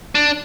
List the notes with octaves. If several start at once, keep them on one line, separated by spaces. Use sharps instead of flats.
D4